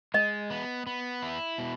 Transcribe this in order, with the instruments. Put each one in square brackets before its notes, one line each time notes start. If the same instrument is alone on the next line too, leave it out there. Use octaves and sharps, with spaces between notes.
[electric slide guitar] G#3 [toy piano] D#5
[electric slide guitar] B3
B3
E4
B2